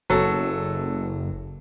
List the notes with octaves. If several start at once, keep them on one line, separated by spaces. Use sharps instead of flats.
F#1 F#3 A4